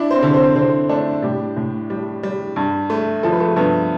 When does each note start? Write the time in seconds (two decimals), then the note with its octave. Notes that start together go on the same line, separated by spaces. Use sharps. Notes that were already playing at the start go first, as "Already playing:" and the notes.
Already playing: D4 E4
0.11 C4 C5
0.22 D3
0.34 C4 C5
0.55 D3 C4 C5
0.89 A3 D4 A4
1.22 A2 G3 G4
1.57 A2
1.90 G3
2.23 G3
2.56 G2
2.90 A3
3.23 F3 A4
3.32 B4
3.40 A3 A4
3.56 G2 B3 B4